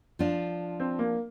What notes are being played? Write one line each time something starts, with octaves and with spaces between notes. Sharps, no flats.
F3 D4 F4
C4
A#3